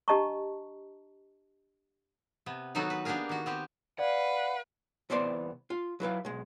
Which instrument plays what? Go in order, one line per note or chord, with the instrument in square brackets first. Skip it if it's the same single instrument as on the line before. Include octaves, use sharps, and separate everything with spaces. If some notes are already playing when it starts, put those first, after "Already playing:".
[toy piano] D4 G4 D#5 A5 A#5 C#6
[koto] C3 B3
D#3 F#3 B3 D#4 F#4 A4
B4
A#3 B3 D4 G4 G#4 A#4
D#3 F#4
B3 C4 G4
[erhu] B4 [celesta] D5 [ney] F5 [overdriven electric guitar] F#5
[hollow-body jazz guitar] C2 E3 B3 C5 D5 C6
F4
F#3 E4 B4 F5
B1 G#3